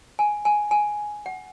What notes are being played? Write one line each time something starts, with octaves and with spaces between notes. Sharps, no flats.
G#5
G#5
G#5
F#5